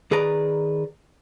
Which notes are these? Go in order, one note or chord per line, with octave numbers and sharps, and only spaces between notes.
D#3 G#4 B4 D5 A#5